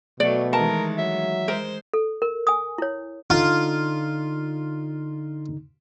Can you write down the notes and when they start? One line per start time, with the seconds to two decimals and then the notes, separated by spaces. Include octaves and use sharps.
0.20 B2 F#3 A3 D5
0.53 D#3 E3 G#3 A#4 A5
0.98 F#3 E5
1.48 G#3 A#4 C5
1.93 A4
2.22 A#4
2.47 G#5 D#6
2.78 E4 C#5
3.30 D3 D#4 F4